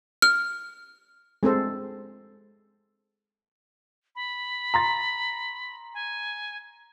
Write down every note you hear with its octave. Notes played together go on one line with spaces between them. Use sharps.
F6
G#3 C4 A4 C5
B5
A#5 C6 A6
G#5